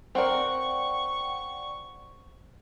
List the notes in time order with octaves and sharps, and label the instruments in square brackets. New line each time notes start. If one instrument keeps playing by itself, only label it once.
[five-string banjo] C4 A#4 [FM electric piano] D5 F#5 G5 [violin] C#6